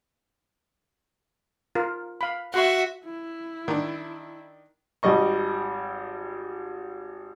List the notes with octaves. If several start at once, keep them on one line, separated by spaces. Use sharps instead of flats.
F4 A#4
F5 B5
F#4 E5 F#5 C6 C#6
E4
D#3 D4
G#1 G3 D#5 C#6